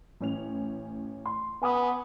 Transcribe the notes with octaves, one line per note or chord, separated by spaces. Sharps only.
A1 C#4 F7
C6
B3 G#5 D6 D#6